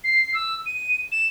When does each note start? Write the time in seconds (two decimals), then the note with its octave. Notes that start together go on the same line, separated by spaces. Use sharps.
0.04 C7
0.34 E6
0.66 D#7
1.12 E7